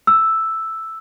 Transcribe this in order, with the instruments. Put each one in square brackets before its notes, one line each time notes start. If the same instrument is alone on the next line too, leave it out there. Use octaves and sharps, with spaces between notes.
[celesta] E6